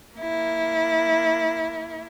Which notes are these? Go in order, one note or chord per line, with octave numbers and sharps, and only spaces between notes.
A#3 E4